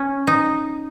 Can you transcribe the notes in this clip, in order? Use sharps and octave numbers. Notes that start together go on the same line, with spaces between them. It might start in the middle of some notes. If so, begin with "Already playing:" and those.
Already playing: C#4
D#4